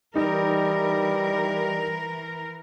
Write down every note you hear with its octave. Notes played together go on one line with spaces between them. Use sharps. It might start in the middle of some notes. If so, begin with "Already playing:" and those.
E3 G3 D#4 A#4